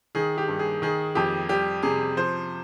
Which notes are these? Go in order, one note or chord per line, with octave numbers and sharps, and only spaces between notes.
D#3 G#4
G4
G2
G#4
D#3 G#4
F2 G4
G3 G4
C3 G#4
F3 C5